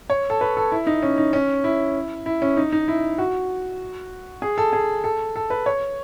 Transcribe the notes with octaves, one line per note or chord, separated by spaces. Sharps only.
C#5
A4
B4
A4
E4
D#4
C#4
D#4
C#4
E4
E4
C#4
D#4
D#4
E4
F#4
G#4
A4
G#4
A4
A4
B4
C#5